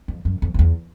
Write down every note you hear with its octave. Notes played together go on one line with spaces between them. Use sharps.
F2
F#2
F2
F2
E2